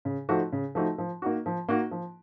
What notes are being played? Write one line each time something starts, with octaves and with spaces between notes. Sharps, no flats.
C#3
F3 A3 D#4 F#4
C#3
F3 A3 D#4 F#4
F3
A#3 D#4 F#4
F3
A#3 D#4 F#4
F3